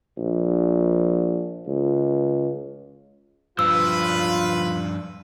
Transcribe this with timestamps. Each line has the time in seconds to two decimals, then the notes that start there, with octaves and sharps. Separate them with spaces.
0.18 A#1
1.67 C#2
3.59 G2 F3 F4 B4 E6